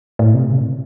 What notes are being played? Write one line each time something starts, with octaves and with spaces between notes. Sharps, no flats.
A2
C3
C#3
A2
C3